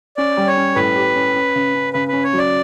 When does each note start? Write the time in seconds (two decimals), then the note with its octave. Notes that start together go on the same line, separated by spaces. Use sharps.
0.17 C#4 D5
0.37 G3
0.47 C#5
0.57 C#4
0.76 A2 B4
0.96 G4
1.15 C#4
1.35 C#4
1.55 C#3
1.75 C#4
1.93 C#3 B4
2.08 C#4 B4
2.23 C#5
2.33 F#3 D5